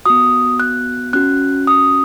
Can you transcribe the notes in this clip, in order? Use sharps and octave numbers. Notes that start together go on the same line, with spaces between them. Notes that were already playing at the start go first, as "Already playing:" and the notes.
B3 F#4 D#6
F#6
C#4 F#4 F#6
D#6